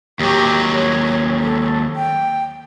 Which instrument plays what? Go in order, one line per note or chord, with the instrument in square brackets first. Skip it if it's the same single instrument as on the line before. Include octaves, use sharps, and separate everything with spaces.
[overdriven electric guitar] D#2 F#3 [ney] G4
[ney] C#5
A4
G5